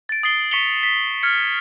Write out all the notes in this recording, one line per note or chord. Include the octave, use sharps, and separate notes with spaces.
A6 D7
D#6 A6 C7 G7
C#6 B6 C#7 F7 G7
B6
F6 G#6 C#7